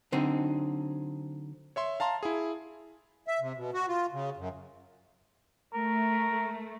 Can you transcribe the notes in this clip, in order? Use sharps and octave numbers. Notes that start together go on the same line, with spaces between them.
D3 F#3 C4 D#4
C#5 E5 C6
F5 A5 A#5 C6
E4 G#4
E5
C3
B2
F#4
F4
C#3
F#2
A3 A#4